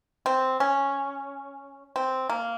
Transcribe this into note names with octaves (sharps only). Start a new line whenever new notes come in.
C4
C#4
C4
A#3